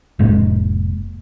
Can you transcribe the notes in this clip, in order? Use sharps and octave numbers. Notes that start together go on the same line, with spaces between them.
F1 A2 G#3 A#3